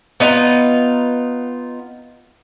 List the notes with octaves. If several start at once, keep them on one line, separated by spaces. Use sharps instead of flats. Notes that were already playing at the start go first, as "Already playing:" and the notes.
B3 D#4 F4 A#5